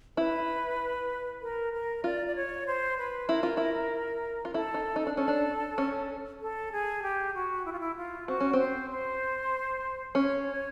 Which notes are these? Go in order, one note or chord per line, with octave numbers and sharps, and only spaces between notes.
E4 B4
A#4
A#4
F4 D5
D5
C#5
C5
B4
E4 A#4
F4
E4
F4
E4 A4
D#4
D#4
D4
C#4 A4
D4
C#4
A4
G#4
G4
F#4
E4
F4
E4
F4
C4 F#4
C#4
C4
C5
C5
C#4 C#5